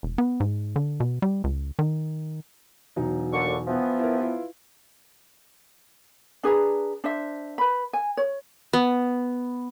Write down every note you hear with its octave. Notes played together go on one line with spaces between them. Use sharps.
E1
B3
G#2
D3
B2
G3
C#2
D#3
E1 F#3 D#4
D#2 D3 C#6
E3 F3 B3
E4 A#4
E4 F4 B4
D4 G#4 B4 A#5
D4 C5 E5
B4 B5
G#5
C#5
B3